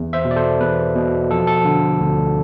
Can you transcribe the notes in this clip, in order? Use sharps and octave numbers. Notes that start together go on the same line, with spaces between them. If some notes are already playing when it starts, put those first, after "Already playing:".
Already playing: E2
C5 E5
B2
D5
A4 C5
E2 B4
B2
F3 A4
A4
D3
D2